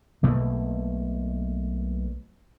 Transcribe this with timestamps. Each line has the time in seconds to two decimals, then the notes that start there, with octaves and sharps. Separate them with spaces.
0.23 B1 B2 A3 A#3